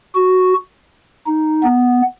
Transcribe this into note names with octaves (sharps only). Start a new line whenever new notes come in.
F#4
D#4
B3